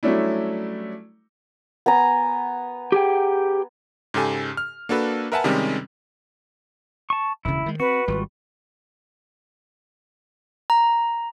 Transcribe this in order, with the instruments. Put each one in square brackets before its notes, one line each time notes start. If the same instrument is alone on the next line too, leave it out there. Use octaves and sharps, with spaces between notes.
[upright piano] F#3 G3 A3 C#4 D4 E4
[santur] B3 G#5 A#5
[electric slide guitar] G4 G#4 G5
[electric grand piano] G#2 C#3 G4 A4 G#5
F6
A#3 D4 F#4 A4 B4
A#4 B4 E5 F#5 G#5 A5
C3 D#3 G3 G#3 C4 C#4
[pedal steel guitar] A5 C#6
[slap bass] E1 D2 C#3 [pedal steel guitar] E4
[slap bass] D#3 G#3
[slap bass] C4 [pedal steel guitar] F#4 [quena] B4
[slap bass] G#1 [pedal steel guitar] G3 F4 F#4
[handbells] A#5